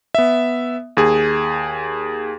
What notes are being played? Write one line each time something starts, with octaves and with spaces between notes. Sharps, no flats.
B3 E5
D#2 G#4